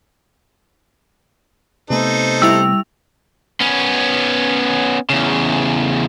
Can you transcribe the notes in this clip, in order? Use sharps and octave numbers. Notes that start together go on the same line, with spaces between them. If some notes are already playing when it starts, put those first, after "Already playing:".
C3 A3 B3 D#4 A4 C5
G3 E4 E6 F7
B3 C#4
E2 C#3